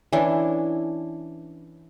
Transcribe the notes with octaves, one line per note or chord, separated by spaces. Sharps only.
E3 C#4 D4 E4